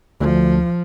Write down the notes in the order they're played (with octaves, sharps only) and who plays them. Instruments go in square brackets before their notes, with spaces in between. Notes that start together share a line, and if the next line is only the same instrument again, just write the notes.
[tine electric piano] D2 [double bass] F3